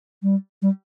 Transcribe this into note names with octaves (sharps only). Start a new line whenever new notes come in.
G3
G3